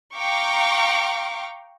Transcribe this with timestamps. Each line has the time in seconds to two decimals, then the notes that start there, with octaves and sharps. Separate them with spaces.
0.16 F5 G5 A#5 C#6 D6